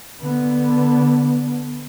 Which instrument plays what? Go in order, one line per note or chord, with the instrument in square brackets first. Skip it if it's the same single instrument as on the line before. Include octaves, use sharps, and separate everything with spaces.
[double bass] D3 B3